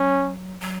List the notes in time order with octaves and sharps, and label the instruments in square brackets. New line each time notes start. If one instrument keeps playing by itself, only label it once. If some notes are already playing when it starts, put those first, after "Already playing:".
Already playing: [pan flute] F#3 [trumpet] C#4
[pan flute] F#3